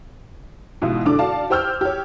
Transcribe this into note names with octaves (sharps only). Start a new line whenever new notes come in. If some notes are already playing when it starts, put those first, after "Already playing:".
G#2 B2 E3 E4 F4
E2 D3 D4 D6
F#4 D5 F5 A5
G4 C5 G5 E6 F6 G6
G4 C#5